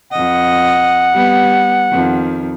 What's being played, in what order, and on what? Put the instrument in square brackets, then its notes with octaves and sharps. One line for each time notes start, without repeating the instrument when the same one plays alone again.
[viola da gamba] F2 D#5 [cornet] F#5
[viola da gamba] G3 B3
F2 D#3